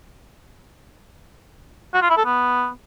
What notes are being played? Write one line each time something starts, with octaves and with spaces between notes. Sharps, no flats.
F#4
F4
E4
A4
B3